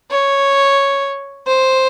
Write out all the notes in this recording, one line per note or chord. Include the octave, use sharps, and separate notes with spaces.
C#5
C5